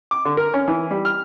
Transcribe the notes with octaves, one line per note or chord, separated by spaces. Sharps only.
D6
D3
A#4
C#4
E3
G3
F6